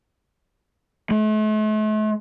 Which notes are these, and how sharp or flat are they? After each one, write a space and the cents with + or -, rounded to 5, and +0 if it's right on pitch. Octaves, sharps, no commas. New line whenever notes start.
A3 -40